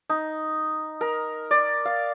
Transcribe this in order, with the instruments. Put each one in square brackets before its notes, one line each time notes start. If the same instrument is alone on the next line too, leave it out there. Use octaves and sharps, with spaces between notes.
[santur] D#4
A#4
D5
F5